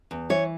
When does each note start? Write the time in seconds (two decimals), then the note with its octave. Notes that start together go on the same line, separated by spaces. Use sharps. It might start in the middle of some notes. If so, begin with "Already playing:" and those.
0.11 E2
0.30 E3 C#5